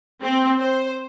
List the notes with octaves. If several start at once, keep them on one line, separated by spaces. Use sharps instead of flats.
C4
C5